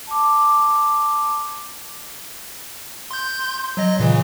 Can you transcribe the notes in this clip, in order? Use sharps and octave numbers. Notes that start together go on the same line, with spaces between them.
A5 D6
C6 G6
F#3 D#5 A#6
A#2 C#3 E3